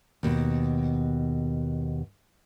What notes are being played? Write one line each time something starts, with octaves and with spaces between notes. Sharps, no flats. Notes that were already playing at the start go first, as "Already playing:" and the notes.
D#2 B2